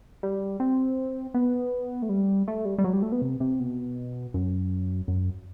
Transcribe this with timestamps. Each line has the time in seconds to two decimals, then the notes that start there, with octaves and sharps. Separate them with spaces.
0.23 G3
0.60 C4
1.34 B3
2.02 A3
2.09 G3
2.48 A3
2.65 G3
2.78 G3
2.84 F#3
2.93 G3
3.02 A3
3.12 B3
3.22 C3
3.40 C3
3.60 B2
4.34 F#2
5.08 F#2